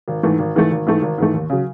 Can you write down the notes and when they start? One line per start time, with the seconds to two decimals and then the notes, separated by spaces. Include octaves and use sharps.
0.08 G#1
0.23 G#2 E3 A3
0.39 G#1
0.55 G#2 E3 A3
0.71 G#1
0.86 G#2 E3 A3
1.02 G#1
1.18 G#2 E3 A3
1.34 D#2
1.50 C#3 F#3